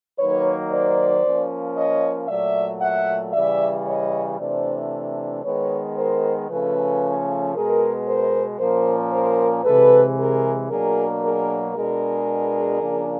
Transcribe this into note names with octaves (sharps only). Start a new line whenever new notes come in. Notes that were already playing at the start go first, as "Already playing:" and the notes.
D#3 F#3 A#3 D#4 B4 C#5
C5 D5
F3 A#3 C#4
C#5 D#5
A#2 F#3 A3 D5 E5
E5 F#5
C#3 E3 G3 D5 E5
C#5 D#5
C3 E3 A3 D4 C5 D5
D#3 G#3 B3 B4 C#5
A#4 C5
C#3 F3 A3 C#4 A4 B4
B2 G#3 B3 G#4 A#4
A#4 C5
A#2 F3 A#3 C#4 A#4 C5
A#4 C5
C3 E3 G#3 A4 B4
G#4 A#4
B2 F#3 A#3 D4 G#4 A#4
G#4 A#4
B2 G#3 B3 D4 G#4 A#4
C#3 F3 A#3 D4